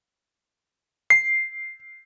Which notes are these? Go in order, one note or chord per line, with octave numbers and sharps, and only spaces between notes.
C7